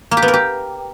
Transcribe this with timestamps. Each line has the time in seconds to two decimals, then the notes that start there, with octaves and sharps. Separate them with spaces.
0.11 A#3
0.17 G4
0.22 B3
0.28 A#4
0.33 G4